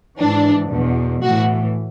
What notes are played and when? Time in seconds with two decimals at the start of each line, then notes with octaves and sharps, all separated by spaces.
0.20 G#2 E3 D4
0.71 E2 B2
1.22 A2 E3 F#4